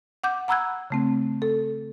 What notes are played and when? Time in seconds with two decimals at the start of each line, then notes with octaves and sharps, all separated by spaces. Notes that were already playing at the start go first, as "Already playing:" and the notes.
0.24 F#5 D6 G6
0.48 F#5 A#5 B5 E6 F#6 G#6
0.90 C#3 A3 C4
1.42 A4